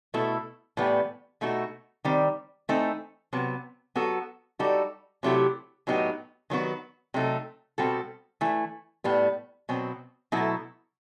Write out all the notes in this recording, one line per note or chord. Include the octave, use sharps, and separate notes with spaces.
B2 A3 E4 A4
A2 E3 G3 B3
B2 A3 D#4 F#4
D#3 G3 C4
E3 A3 C4 D#4 A4
C3 F#3 B3
F#3 B3 F#4 A4
G3 D#4 F#4 A4
C3 F#3 A3 E4 G4
A2 F#3 B3 D#4 G4
D#3 F#3 B3 F#4
C3 F#3 A3 D#4 A4
B2 G3 C4 F#4 A4
E3 A3 E4
A2 G3 B3
B2 F#3 C4
B2 F#3 A3 E4 A4